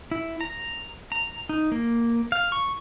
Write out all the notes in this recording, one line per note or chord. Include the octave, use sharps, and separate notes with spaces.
E4
A#5
A#5
D#4
A#3
F5
C#6